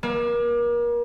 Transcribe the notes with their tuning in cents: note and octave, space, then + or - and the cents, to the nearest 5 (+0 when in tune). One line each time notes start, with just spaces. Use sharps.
A#3 +35